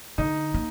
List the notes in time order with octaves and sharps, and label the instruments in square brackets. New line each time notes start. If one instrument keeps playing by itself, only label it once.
[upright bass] D3 [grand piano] D#4
[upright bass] A#3